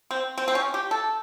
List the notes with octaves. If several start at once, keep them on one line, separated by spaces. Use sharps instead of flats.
C4
C4
C4
C#4
G4
A4